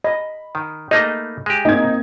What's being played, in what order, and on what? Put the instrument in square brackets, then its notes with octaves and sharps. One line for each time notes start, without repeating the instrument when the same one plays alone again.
[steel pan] D#5 [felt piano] B5
[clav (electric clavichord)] D#3
[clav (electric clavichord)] A3 A#3 D#4 [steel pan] D#5
[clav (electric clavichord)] G#3 G4
[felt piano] A#3 C4 [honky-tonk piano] D#4 G#6